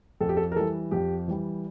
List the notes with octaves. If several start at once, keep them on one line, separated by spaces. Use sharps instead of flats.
F2 A4
G4
A4
A#4
E3 G3 A4
F2 G4
E3 G3